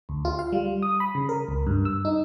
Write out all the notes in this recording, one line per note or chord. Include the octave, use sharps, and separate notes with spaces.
D2
F4
F5
G3
D#6
B5
C#3
A#4
C#2
G2
E6
D#4